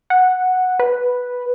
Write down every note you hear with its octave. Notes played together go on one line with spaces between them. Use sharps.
F#5
B4